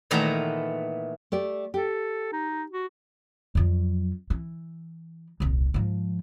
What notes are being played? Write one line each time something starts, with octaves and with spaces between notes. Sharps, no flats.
A#2 D#3 E3 A3 B3 A#5
A3 G4 D5
G4 A4
D#4
F#4
F2 F#3
E3
D#1 C2
G#2 F3